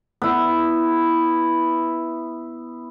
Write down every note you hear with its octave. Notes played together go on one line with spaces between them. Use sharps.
B3 E4